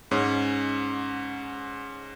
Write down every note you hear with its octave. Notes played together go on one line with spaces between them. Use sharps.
G#2 C#4